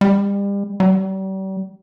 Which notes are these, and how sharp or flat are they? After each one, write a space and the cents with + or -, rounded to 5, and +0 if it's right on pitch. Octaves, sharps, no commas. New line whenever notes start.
G3 +35
G3 -40